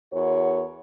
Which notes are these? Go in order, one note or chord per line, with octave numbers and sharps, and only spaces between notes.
E2 F#4 A#4 C#5